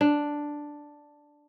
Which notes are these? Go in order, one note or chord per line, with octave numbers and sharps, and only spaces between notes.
D4